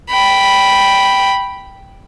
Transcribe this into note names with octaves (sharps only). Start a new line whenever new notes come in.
G5 B5